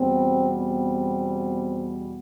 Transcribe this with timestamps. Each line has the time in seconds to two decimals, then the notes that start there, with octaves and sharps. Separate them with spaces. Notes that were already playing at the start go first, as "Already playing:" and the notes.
Already playing: E2 B2 G3 B3 C4
0.58 C4